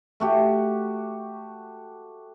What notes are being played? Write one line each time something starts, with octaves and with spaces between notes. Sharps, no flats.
A3 F#4 G4